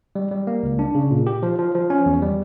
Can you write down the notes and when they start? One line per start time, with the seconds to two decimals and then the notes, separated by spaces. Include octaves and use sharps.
0.15 G3
0.31 G3
0.47 A#3
0.63 C#2
0.79 D4
0.95 C#3
1.11 A#2
1.27 G4
1.43 F3
1.59 F3
1.75 F3
1.90 C#4
2.06 E2
2.22 G3